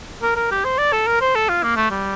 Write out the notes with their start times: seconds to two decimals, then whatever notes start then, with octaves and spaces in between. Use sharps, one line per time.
0.23 A#4
0.36 A#4
0.52 G4
0.65 C5
0.79 D5
0.93 A4
1.07 A#4
1.21 C5
1.35 A4
1.49 F4
1.63 A#3
1.76 A3
1.91 G3